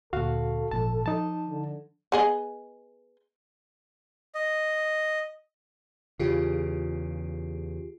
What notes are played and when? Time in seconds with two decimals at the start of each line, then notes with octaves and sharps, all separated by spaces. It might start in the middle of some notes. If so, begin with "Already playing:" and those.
0.13 D2 A#2 F#4 A4 F5
0.71 G#1 A#2 F3 A5
1.06 F3 D#4 A5
1.47 D3
2.12 B3 G#4 D#5
4.35 D#5
6.20 E2 C#3 F4 G4 G#4